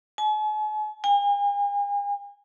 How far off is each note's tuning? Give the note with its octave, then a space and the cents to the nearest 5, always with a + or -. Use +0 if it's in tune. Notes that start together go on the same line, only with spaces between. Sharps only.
G#5 +45
G#5 -45